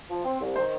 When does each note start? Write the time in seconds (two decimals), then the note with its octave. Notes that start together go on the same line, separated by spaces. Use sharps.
0.10 F3
0.25 C4
0.41 C2
0.56 D#3 C5